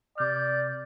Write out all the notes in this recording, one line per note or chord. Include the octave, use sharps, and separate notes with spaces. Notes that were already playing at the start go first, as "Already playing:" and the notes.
C3 D5 F6 G6